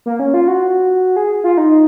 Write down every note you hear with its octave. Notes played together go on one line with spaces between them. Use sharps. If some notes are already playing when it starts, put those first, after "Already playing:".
A#3
C#4
F4
F#4
G#4
F4
D#4